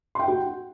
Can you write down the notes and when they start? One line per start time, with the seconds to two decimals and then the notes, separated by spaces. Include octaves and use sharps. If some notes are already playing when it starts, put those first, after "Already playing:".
0.15 C6
0.19 G5
0.24 F#5
0.28 F#4